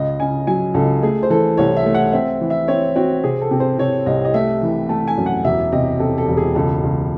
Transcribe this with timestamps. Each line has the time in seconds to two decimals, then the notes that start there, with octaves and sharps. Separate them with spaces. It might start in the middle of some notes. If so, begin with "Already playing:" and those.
Already playing: C#2 D#5
0.20 C#3 G#5
0.47 F#3 G#5
0.74 C#2 A4
1.03 A3 G#4
1.23 C5
1.30 E3 A4
1.57 C2 C#5
1.77 E5
1.86 A3
1.94 F#5
2.13 C4 E5
2.41 E3
2.50 E5
2.68 C4 C#5
2.96 C4 F#4
3.24 C3 G#4
3.41 A4
3.51 C3
3.60 C5
3.78 C3 C#5
4.06 C2 D#5
4.25 D#5
4.34 A3 E5
4.62 E3
4.89 A3 A5
5.08 G#5
5.17 F#2
5.26 F#5
5.45 E1 E5
5.72 C3 D#5
5.99 C3 A4
6.18 A4
6.28 E1
6.37 G#4
6.55 C#2 A4
6.83 C#2